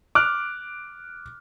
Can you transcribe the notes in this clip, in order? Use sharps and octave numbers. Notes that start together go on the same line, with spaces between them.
D6 F6 F#6